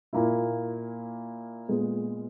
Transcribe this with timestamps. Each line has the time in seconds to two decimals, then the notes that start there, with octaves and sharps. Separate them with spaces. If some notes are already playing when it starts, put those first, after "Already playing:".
0.13 A#2 A#3 E4
1.68 A#2 G#3 B3